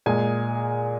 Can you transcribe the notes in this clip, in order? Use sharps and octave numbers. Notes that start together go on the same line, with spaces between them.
A#2 G#3 G#4 G#5